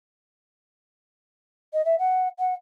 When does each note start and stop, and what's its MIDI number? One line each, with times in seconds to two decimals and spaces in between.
1.73 1.84 75
1.85 1.95 76
1.98 2.28 78
2.39 2.54 78